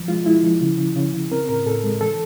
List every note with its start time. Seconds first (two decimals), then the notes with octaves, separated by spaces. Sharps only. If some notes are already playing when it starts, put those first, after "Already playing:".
Already playing: F3
0.08 G#3 F4
0.26 G#3 E4
0.43 F3
0.61 C#3
0.78 C#3
0.96 C#3
1.13 C#3
1.31 C4 A#4
1.49 A2 A#4
1.66 A2 A4
1.83 G#3
2.01 E3 A4